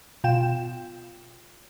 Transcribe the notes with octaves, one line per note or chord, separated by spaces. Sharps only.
B2 F4 G5 E7